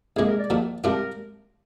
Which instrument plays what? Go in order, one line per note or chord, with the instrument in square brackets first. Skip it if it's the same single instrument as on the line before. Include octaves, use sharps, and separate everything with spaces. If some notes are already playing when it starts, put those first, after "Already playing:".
[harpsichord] C2 A#2 G#3 [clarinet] G#4
[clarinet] A#4
D5
[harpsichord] A#1 A#2 F3
[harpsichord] C3 G3 D4 F4 [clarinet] A#4